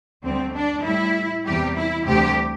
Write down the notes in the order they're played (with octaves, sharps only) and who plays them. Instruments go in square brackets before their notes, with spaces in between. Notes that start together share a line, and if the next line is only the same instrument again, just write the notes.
[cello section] D2 D3 G3 C4
D4
A2 G3 E4
E2 C3 E3 G3 G4
E4
D2 C3 E3 G3 G4